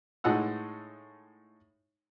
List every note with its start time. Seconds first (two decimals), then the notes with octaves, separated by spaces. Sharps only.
0.24 A2 G#3 D#4 F#5 E6